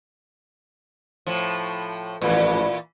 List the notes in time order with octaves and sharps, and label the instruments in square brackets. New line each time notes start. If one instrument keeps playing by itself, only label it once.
[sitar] A2 F3
[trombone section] A1 F3 B4 [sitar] A#2 E3